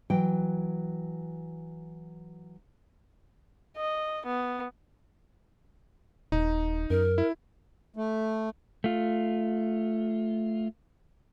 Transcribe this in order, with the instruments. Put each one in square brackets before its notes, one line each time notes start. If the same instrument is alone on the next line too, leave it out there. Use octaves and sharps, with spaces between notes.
[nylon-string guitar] E3 F#3 G5
[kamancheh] D#5
B3
[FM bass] D#1 [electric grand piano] D#4
[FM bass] F#2 [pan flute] A#4
[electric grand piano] E4
[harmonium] A3
[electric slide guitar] A3 F4